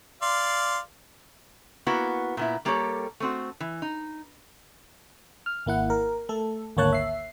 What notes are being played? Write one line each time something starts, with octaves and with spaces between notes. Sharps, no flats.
D5 F5 C6
A#3 B3 E4 F#4
A#2 B3 E4
G3 A#3 G4 A4 C5 C#5
A3 C4 F#4
E3
D#4
F6
G#1 A#3 E4 F#5
A#4
A3 A4
G#1 D2 A#3 C#5 A5 F#6
E5 C7